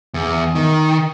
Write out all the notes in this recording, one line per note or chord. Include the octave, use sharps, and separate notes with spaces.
E2
D#3